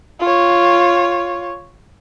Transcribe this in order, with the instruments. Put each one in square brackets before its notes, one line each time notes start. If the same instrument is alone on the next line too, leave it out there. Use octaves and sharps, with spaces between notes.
[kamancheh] F4 C#5